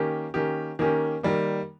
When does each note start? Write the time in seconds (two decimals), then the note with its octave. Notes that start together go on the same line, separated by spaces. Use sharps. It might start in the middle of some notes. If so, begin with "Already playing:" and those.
Already playing: D#3 A#3 C#4 G4
0.34 D#3 A#3 C#4 G4
0.79 D#3 A#3 C#4 G4
1.23 D#3 G3 A#3